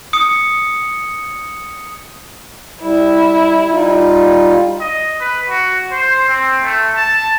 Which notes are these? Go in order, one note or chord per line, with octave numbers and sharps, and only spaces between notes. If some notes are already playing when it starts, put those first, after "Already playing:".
D#6 C#7
G3 E4
G3 D#4 F4
D#5
B4
F#4
C5
C4
A3
A5